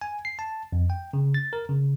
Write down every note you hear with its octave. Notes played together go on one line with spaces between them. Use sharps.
G#5
C7
A5
F2
G5
C#3
A6
A#4
C#3